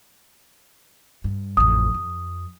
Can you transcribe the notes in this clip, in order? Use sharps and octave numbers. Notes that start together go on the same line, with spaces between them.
G2
A1 F2 D#6
F2